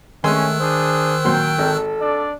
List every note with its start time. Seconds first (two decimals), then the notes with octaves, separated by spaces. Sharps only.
0.24 D#3 G#3 A3 C#4 G#5 C6 E6 F#6
0.60 D4 G#4 C5 D#6
1.25 A#2 F#3 G5 C6
1.58 G#1 A4
1.99 D4 D5